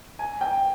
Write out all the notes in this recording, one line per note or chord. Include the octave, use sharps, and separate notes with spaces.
G#5
G5